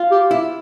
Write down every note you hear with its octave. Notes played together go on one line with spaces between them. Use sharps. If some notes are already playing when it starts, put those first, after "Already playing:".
Already playing: F4
G4
E4